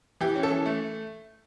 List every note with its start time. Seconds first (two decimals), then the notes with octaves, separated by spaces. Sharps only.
0.21 E3 G4
0.36 C#4
0.43 A4
0.50 E3
0.66 A3